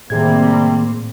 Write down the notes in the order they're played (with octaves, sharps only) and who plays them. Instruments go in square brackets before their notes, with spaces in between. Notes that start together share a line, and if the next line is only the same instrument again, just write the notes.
[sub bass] A2 [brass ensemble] C3 G3 [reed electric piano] D#3 G#4 G#6 [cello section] A#3 C4